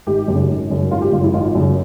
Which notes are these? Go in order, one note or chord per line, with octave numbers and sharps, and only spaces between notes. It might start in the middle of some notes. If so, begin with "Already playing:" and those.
G#1 G4
F#2 C#3
G#1
F#2 C#3
G#1 F4
G4
F#2 C#3 F4
E4
G#1 F4
F#2 C#3